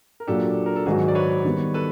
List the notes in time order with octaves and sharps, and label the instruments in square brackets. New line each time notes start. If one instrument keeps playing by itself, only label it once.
[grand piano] A#4
[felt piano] A#2 F#3 A#3 D4 [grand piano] G4 A4
[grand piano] A#4
A4
[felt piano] G#2 D#3 F#3 [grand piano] F#4 G#4
[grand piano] D5
B4 C#5
[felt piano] D#3 G3 B3
[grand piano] A4 B4